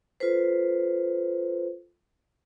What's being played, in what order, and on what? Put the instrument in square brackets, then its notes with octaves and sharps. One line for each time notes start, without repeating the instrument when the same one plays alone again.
[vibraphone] F4 A4 B4 C5